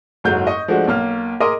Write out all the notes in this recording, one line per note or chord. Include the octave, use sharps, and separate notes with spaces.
F#1 G#2 F#3 A4 G6
D#5 C#6
F3 G#3 A3 D4 F#4
B1 A#3 F6
G#4 A#4 D#5 C6 D6 D#6